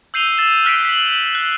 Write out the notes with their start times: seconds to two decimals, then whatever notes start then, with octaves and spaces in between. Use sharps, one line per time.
0.14 E6 G6 C7 D#7 F7 G7
0.38 E6 A6 E7
0.65 F6 F#6 B6 C7 D7
0.85 B6 F#7
1.35 F#6